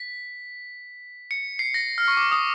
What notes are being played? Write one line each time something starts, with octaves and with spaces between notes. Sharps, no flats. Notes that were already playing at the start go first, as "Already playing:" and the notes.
Already playing: B6
C#7
C7
A#6
F6
C#6
D6
D#6